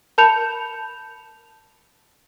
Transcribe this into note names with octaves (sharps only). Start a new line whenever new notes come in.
A#4 A5 B5 G6 C#7 F7